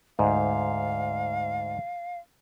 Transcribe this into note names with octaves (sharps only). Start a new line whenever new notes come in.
D2 G#2 F5